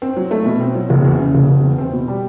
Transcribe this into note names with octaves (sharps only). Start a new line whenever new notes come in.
C4
F#3
A3
B2
C4
F#3
F#1
E2
C#3
F#1
F#1
E2
C4
B2
G3